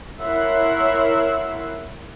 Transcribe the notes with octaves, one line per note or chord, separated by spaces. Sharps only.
E4 A#4 C#5 E5 F#5 C6